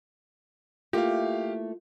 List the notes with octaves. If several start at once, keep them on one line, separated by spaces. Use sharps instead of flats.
A3 A#3 E4 F4 G4 F5